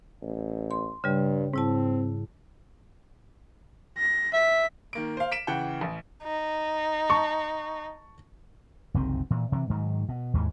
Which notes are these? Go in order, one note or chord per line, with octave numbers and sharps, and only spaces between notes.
A1
C6
G2 C#3 G3
G#2 C4 E4 A5
A#6
E5 B6
D#3 A#3 D7
C5 F5
B6 D7 E7
C#3 E3 F#5 G5
A1
D#4
A5 C#6
F#1 C2 D#3 C4
A#2 E3
C3 E3
G#2 D#3 F#3
B2
D#2 G#2 E3